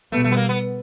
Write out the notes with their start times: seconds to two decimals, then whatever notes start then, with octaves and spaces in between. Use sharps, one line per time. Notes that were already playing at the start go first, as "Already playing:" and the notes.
0.12 B2 G3 A3 B3
0.24 A3
0.32 B3
0.37 A#3
0.49 B3